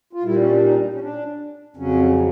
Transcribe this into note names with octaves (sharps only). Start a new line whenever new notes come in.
F4
A#2 G3 E4
C#4
D4
D#4
C#4
D4
F2 C#3 F#3 C#4